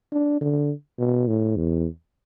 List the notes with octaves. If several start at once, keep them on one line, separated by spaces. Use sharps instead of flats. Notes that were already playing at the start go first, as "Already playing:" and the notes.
D4
D3
B2
A2
E2